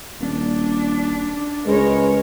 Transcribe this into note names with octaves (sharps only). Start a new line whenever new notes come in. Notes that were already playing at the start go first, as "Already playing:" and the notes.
D#1 D4
C#2 G#3 A#4 B4 C#5